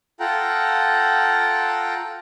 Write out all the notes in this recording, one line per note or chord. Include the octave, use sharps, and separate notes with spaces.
F4 A4 F#5 G5 A#5